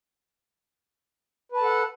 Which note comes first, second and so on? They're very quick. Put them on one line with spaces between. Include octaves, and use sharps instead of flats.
B4 A5 A4 F#5